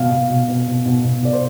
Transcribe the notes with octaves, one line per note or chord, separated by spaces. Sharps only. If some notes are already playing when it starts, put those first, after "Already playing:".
Already playing: B2 F5
B2
B2
B2
B2
B2
B2
B2 D5
C5